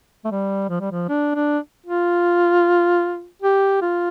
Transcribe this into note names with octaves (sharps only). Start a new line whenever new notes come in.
A3
G3
F3
G3
F3
D4
D4
F4
G4
F4